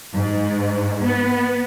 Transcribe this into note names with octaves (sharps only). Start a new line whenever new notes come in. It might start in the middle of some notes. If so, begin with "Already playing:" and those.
G#2
B3